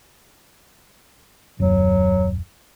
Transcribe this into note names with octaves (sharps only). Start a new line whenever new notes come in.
D#1 F#2 F#3